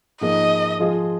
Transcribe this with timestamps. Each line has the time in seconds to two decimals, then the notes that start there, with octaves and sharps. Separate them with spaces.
0.21 G#2 F3 A#3 G#4 D#5
0.79 F3 G#3 F4 G#4